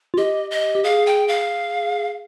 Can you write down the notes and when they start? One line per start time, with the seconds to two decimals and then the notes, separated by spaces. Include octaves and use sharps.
0.14 F4
0.18 G4 D#5
0.51 D#5
0.75 G4
0.84 G#4 F5
1.07 G5
1.28 F5